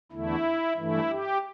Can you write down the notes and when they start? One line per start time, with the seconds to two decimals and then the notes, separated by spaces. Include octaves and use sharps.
0.12 E2 D3 A3 E4
0.77 G2 E3 A3 E4
1.10 G4